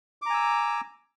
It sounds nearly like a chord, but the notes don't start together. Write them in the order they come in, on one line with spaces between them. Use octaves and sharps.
D6 A#5 G#5 E6